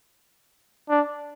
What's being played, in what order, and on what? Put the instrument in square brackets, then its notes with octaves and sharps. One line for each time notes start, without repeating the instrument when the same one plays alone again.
[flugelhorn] D4